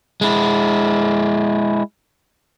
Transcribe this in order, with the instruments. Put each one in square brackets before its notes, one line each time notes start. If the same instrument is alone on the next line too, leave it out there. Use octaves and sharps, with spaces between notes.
[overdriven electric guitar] G#3 E4